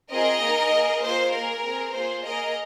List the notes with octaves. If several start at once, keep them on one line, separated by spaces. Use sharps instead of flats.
C4 F4 G#4 A#4 D#5
A#3 D#4 G#4
A#3 G#4
A#3 F4 G#4 C5
A#3 G#4 A#4
C4 G#4
A#3 F4 G#4 C5
A#3 G#4 A#4 D#5